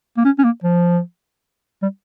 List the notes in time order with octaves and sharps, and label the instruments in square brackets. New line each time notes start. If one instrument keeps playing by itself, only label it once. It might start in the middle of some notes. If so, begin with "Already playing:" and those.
[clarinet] A#3
C#4
C#4
A#3
F3
G3